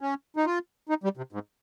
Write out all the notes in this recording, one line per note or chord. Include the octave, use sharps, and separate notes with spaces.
C#4
D#4
F4
D#4
G3
C3
G#2